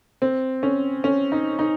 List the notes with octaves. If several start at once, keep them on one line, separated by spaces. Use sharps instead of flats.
C4
C#4
C#4
D#4
D#4